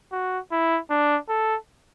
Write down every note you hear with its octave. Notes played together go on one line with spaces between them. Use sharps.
F#4
E4
D4
A4